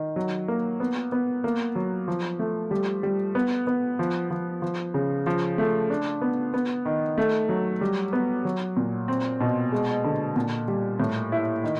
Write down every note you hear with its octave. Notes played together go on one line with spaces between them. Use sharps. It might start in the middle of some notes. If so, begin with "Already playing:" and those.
Already playing: D#3
F#3
A#3
B3
B3
A#3
F#3
F3
A3
G3
G3
B3
B3
F3
F3
F3
C#3
F3
A3
D4
B3
B3
D#3
A3
F#3
G3
B3
F#3
A#2
C4
B2
G#3
D3
A#2
G3
A2
E4
D#3